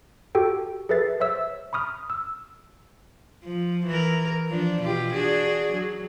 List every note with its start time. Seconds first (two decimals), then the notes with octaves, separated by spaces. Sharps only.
0.35 F#4 G4 A4 G5
0.89 G#4 A4 B4 E5 A6 C7
1.20 C5 C#5 E5 E6
1.73 B5 C#6 D#6 F6
2.10 E6
3.43 F3
3.86 E3 A#4
4.49 F3 D4
4.80 B2 F4 G4
5.13 D4 F#4 G#4
5.73 F#3